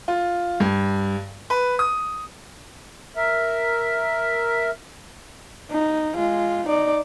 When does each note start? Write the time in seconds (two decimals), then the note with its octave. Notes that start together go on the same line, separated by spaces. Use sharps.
0.08 F4
0.60 G2
1.50 B4
1.79 D#6
3.16 A#4 E5
5.71 D#4
6.15 G#3 F4
6.67 D#4 D5